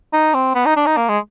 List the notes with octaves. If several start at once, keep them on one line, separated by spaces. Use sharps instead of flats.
D#4
C4
B3
D#4
D4
D#4
A#3
G#3